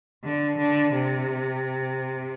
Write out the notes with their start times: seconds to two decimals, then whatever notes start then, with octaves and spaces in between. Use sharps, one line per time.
0.24 D3
0.58 D3
0.93 C3